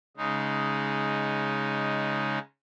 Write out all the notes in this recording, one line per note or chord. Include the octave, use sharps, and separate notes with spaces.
C#3 G#3 D#4